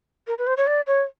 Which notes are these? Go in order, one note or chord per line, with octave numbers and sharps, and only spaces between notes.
A#4
B4
C5
C#5
D5
C#5